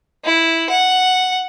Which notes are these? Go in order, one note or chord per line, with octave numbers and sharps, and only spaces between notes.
E4
F#5